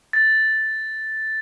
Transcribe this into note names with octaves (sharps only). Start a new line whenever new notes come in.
A6